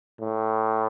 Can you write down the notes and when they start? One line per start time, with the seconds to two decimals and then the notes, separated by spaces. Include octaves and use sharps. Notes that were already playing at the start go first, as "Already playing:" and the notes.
0.21 A2